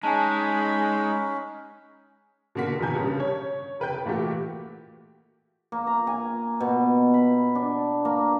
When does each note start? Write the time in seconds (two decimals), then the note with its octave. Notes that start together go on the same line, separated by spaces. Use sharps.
0.03 G#3 C#4 D#4 G#5 A5 B5
2.55 B2 D3 A#3 F#4 B6
2.79 F1 B2 D#3 G#5 G6
2.94 G2 C#3 G3
3.20 C#5
3.80 F1 B4 G5 G6
4.05 A#2 E3 A3 F#4 G4
5.72 A#3
5.87 A#5
6.07 G#5
6.60 B2
7.14 B5
7.55 D4
8.05 A#3